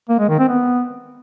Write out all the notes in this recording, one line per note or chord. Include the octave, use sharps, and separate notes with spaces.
A#3
G#3
D#3
C4
B3